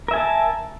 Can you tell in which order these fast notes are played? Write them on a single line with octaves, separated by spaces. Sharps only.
A#4 E5 G#5 A5